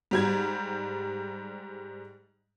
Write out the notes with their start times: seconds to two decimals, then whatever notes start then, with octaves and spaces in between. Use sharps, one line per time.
0.11 G#2 G3 G#6